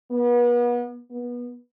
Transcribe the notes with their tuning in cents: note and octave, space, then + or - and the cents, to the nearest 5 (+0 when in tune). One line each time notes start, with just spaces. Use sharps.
B3 -35
B3 -25